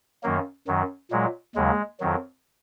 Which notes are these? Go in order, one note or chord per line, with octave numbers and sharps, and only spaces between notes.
F#2 D#3 F#3 A#3
F#2 D#3 F#3
A#2 F#3 G#3
D#2 C#3 F#3 G#3
F2 D#3 F#3